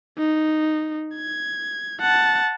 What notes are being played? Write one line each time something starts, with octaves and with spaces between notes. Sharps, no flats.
D#4
G#6
F#5 A5